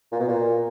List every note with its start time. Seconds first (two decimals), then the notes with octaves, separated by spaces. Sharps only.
0.12 A#2
0.19 B2
0.28 A#2